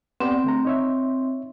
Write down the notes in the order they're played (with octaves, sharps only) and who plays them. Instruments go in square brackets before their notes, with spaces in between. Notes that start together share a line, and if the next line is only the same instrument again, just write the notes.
[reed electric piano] B3 G4 D5 [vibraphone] C4
[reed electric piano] D3 A3 A#5
D#4 C#5 E5